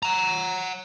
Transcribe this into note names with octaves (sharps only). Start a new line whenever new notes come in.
F#5 A#5